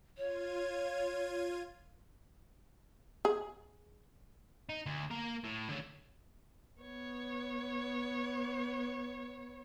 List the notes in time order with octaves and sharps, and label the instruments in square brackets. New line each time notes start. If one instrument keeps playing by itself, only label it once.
[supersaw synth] F4 G#6 D#7 [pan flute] C#5
[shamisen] G#4
[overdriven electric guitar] D#4
D2
A#3 A#4
A2
D3 C#4
[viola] B3 C#5